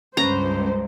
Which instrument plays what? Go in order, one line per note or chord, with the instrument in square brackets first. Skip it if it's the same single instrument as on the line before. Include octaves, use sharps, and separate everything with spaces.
[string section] C#2 G2 [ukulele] C#4 B4 [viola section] C5 [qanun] A#5